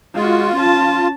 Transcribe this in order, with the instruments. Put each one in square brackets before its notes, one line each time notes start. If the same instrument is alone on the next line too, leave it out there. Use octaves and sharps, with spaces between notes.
[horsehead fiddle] G#3 F#4 [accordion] F4
[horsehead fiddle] C#4 A5